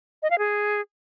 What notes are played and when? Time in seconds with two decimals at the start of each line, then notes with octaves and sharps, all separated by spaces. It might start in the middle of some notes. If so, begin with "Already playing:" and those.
0.23 D#5
0.30 F5
0.38 G#4